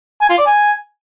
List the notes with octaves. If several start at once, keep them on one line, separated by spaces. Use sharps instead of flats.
G#5
F4
D5
G#5